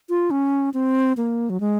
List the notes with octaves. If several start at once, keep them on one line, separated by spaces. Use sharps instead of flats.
F4
C#4
C4
A#3
F#3
G#3